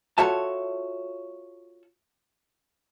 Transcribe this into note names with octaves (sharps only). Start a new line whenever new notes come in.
F4 F#4 A4 C#5 E5 A5